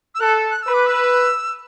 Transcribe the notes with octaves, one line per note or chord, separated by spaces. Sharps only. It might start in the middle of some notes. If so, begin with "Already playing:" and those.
E6
A4 F#6
F#6
B4 E6
D6
E6